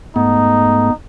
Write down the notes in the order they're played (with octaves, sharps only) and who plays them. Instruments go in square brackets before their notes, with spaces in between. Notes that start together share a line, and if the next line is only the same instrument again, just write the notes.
[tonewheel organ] G#2 A3 [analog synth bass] B3 [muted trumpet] D#4